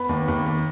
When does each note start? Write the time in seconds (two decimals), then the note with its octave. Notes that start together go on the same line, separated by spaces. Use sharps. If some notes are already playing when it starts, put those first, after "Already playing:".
Already playing: B3 B5
0.09 D#2
0.28 D#2
0.46 D#2